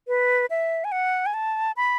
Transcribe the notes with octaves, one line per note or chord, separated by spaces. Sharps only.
B4
E5
G#5
F#5
G#5
A5
B5